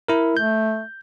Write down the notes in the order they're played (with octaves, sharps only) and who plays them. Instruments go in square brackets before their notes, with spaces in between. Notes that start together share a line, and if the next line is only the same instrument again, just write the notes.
[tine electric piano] E4 A#4
[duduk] A3 [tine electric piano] G6